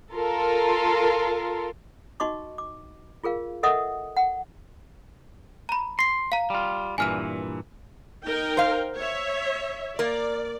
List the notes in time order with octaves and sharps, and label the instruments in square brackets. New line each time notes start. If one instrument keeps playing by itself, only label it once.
[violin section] F4 A4 A#4
[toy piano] D#4 F#4 D#5 C#6 D6
D6
F4 G#4 A#4 F5
A4 A#4 D#5 E5 F#5 D#6
F#5
[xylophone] A#5 B5
[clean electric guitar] C6 [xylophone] A#6 C7
[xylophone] F5 A#5
[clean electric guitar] G3 F4
[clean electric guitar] G2 A#2 E3 [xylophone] G#5 F6 D#7
[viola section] D#4 A#4 G5
[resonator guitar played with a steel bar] C5 F5
[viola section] C#5 E5
[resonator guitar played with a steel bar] A#3 A#4 [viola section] D5